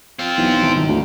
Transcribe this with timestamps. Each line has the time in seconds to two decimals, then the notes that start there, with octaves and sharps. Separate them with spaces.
0.19 C4 F4
0.38 B1 E3
0.63 G#1 E4
0.75 D#1 G#1
0.88 D2